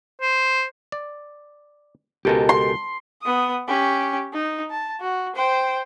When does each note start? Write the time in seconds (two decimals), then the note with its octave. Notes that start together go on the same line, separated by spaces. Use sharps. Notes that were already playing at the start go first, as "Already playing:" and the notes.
0.21 C5
0.92 D5
2.25 C#2 B2 G#3 G4 A4 A#4
2.49 C6
3.22 B3 D#6
3.68 C#4 G4
4.33 D#4
4.70 A5
5.00 F#4
5.35 C5 G5